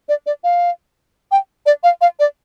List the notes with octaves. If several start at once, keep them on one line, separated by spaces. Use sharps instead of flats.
D5
D5
F5
G5
D5
F5
F5
D5